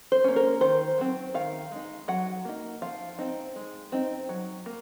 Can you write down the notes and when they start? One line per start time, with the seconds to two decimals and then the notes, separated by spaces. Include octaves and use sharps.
0.12 C5
0.24 A#3 C#4
0.36 A#4
0.61 D#3 C5
0.98 F#3 C4
1.34 D#3 F5
1.72 G#3 D#4
2.08 F#3 F#5
2.45 A#3 D#4
2.82 F3 F5
3.19 C4 D#4
3.56 G#3
3.92 C4 D#4
4.29 F#3
4.66 A#3